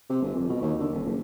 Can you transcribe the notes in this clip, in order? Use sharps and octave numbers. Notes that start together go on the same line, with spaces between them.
C3
G1
F2
B2
D#2
D3
D#1
F#1